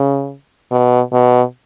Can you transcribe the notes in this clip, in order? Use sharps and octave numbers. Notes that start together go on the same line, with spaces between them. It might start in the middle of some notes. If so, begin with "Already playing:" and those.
Already playing: C#3
B2
B2